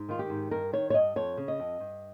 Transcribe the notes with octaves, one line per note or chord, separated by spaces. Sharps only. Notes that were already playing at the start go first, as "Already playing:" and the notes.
Already playing: G#2
D#3 F4
G4
G#2
G2 A#4
D#3 C#5
C#5
G2 D#5
F2 C#5
C#3
D#5
F2
G2